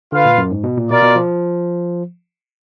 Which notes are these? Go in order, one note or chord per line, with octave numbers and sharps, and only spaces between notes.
D3 F4 B4 F5
A#2
F#2
G#2
B2
A#2
B2 F4 A#4 D5
B2
F3